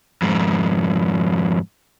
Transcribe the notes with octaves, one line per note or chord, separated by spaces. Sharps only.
F2 G#2